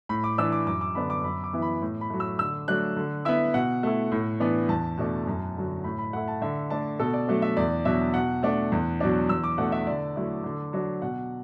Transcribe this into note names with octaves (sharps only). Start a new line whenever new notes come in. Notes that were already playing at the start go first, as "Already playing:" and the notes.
A2 B5
D6
E3 D4 E6
D6
F#2 D6
D6
D3 B3 D4 B5
D6
F#2 B5
D6
E3 B3 E4
B5
A2
B5
F#3 A3
E6
D3 E6
F#3 A3 D4 F#6
D3
B3 E4 E5
B2 F#5
A3 E4
A2
E3 B3 D4
E2 A5
B2 A3 D4
F#2
D3 F#3
A2 B5
B5
A3 E4 F#5
A5
D3 E5
A3 D4 A5
B2 A4
D5
F#3 A3 D4
E5
E2 D5
B2 F#3 D4 E5
B2 F#5
A3 D4
E2
B2 F#3 D4
E2 E6
D6
B2 A3 D4 F#5
E5
D3 D5
F#3 A3 E4
D3
F#3 D4
B2 F#5